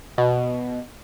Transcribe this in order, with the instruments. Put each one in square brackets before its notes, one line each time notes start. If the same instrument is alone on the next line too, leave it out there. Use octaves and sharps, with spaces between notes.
[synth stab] B2